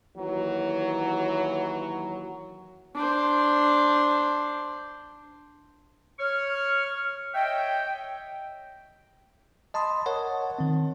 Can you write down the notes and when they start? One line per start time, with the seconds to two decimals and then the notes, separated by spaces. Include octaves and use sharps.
0.17 D#2 E3 F#3
2.95 D4 C5
6.19 C#5 C#6 F6
7.34 C#5 D#5 E5 G5
9.74 D#5 A5 B5 C6 D#6
10.06 A#4 C#5 D#5 F#5 A5
10.59 D#3 C4